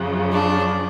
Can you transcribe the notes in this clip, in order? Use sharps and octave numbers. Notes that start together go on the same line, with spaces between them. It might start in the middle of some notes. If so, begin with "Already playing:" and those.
Already playing: F#2 C#3 F3
D4